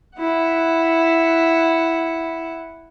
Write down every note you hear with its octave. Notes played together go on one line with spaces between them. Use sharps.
E4 F#5